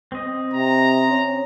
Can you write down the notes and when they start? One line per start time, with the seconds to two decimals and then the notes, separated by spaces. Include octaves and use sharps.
0.12 C4 D#5
0.54 C3 A#5
1.10 C#4